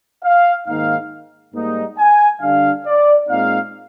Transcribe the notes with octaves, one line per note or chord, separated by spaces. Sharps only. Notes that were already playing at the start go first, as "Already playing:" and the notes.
F5
G#2 D#3 A#3 D#4 F5
G#2 G3 A#3 D#4
G#5
D3 G3 D4 F5
D5
A#2 G#3 C4 D#4 F5